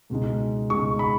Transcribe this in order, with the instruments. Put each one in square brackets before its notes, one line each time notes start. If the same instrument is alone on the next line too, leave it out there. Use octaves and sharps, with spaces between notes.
[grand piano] C#2 B2 G#3 D#4
C#2 B2 G#3 D#4 C#6
B5